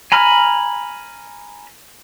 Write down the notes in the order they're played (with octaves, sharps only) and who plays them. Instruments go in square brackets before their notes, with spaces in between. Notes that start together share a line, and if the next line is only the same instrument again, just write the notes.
[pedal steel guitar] G#5 A#5 B5 F6